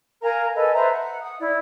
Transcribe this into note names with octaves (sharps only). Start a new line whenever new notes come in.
A#4 F5 G#5 A#5
A4 B4 D#5 G#5
B4 C5 E5 A#5
F#5
F#5 D#6
E4 D5